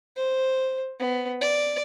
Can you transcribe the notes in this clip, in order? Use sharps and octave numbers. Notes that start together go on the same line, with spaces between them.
C5
B3
D5